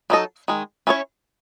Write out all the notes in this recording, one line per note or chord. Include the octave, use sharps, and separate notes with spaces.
F#3 B3 D#4 A4 D#5
D#3 G#3
C#4 E4 A4 C#5